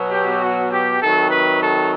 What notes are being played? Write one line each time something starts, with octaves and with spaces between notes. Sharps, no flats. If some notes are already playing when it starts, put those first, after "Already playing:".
Already playing: B2 F#3
G4
F#4
G4
C3 D#3 F#3 A4
B4
A4